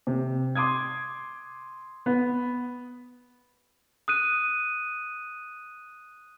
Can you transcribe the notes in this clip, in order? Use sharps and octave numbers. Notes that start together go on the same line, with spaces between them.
C3
C6 D6 D#6 G#6
B3
D#6 F#6 D#7